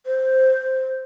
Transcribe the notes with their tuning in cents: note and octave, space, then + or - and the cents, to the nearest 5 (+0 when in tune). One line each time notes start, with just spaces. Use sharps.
C5 +0